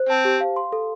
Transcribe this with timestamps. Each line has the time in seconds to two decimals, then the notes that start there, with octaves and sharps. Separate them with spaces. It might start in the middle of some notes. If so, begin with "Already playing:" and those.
Already playing: C5
0.09 C4 A5
0.25 G4
0.41 F5
0.56 C6
0.73 A4